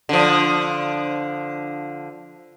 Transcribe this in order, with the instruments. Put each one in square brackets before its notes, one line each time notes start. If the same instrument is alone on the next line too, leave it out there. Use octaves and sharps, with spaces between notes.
[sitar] D3 F3